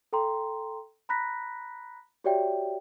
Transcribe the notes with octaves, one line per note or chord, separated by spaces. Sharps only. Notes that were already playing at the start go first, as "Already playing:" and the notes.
A4 G5 A#5 C6
A#5 B5 F#6 A#6 B6
F#4 G4 C#5 D5 E5 G5